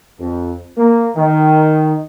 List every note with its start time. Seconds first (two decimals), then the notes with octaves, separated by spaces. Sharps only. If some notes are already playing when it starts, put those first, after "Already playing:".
0.20 F2
0.77 A#3
1.16 D#3